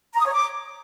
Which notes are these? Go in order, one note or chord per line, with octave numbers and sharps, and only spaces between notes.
A#5
D#6
C#5
D6